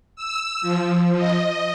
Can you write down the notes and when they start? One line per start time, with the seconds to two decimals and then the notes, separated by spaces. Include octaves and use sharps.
0.16 E6
0.61 F3
1.16 D#5